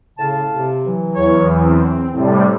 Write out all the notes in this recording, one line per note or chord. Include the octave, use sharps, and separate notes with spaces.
A2 C#3 F5 A5
C3
E3 F#3
E2 C#5
C4
A2 C3 G3